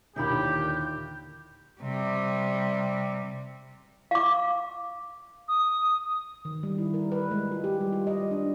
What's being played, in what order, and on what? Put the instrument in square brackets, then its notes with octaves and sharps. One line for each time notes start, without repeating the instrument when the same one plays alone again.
[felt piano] D#2 A#2 D3 [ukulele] D#4 E4 B5 [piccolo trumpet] G4 [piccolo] G6
[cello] C3 G3
[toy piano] F5 D6
[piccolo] D#6
[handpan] D#3
G3
E4
A#4
B4
G#3
F4
G4
G3
F4
D#5
D4